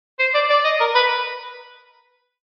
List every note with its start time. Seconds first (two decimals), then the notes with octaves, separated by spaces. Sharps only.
0.20 C5
0.35 D5
0.50 D5
0.64 D#5
0.81 A#4
0.95 B4